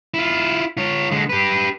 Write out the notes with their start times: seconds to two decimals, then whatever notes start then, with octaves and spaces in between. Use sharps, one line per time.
0.14 E4 F4
0.77 F4 C#5
1.11 D3 G#3
1.29 G4 B4